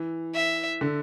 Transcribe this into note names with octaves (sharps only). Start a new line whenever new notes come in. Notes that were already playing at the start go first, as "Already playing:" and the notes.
Already playing: E3
E5
D3